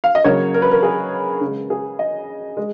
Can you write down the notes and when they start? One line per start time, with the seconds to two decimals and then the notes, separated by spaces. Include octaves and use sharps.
0.04 F5
0.15 D#5
0.24 C#3 F#3 A#3 C#5
0.54 A#4
0.62 B4
0.71 A#4
0.83 G#4
1.41 C#3
1.46 G#3
1.70 G#4
1.99 D#5
2.57 G#3